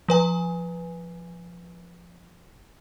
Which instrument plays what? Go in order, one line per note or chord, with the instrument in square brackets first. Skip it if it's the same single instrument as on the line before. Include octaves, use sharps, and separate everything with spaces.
[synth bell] F3 B4 G#5